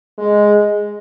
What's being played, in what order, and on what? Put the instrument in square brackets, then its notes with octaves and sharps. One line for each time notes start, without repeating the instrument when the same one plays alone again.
[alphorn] G#3